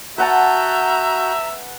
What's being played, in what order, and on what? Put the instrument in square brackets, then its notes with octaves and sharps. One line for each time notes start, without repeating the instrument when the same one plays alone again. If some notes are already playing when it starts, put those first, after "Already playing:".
[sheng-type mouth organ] F#4 G6 [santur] B4 F#5 A5 [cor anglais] E5 [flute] A#5